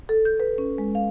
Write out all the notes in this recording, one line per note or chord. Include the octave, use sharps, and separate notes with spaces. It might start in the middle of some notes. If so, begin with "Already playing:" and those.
A4
G6
B4
C#4
G#3
F5